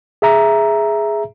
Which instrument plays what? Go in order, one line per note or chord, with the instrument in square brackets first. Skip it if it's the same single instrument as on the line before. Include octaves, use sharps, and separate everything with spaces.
[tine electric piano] G#4 E5 A#5